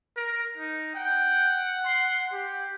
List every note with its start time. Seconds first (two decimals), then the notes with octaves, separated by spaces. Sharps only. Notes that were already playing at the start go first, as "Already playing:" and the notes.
0.17 A#4
0.57 D#4
0.95 F#5 G5
1.85 C6
2.33 G4